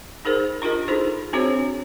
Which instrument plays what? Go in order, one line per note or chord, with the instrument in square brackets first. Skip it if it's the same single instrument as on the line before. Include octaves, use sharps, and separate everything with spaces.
[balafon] D#4 G#4 A#4 C5
D4 F4 G4 A#4 D#5
D#4 E4 G#4 A4 C5
C4 D4 F#4 G#4 C5 C#5